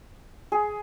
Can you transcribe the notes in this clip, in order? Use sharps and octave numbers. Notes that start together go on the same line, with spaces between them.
G#4